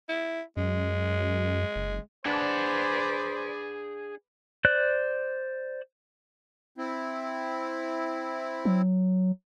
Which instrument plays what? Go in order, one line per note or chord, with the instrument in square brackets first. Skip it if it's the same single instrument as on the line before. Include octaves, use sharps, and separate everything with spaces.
[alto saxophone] E4
[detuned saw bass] F#2 [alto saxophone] G#3
[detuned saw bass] F#1
[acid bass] D4 [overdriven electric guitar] G#4 F#5 [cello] B4 D5 [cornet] C5
[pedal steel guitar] C5 D5 F#6
[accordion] C4 E4
[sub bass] F#3